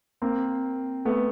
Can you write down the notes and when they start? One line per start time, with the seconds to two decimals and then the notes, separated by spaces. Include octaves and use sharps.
0.22 A#3 C4
1.05 A3 B3